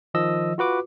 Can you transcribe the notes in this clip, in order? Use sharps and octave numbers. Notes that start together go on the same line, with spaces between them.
D#3 F3 D#5 E6
F4 F#4 B4 D6